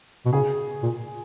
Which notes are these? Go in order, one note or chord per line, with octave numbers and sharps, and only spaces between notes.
B2
C#3 G#4
A#2